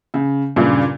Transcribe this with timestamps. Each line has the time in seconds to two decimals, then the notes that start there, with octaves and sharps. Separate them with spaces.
0.14 C#3
0.56 G2 A#2 C#3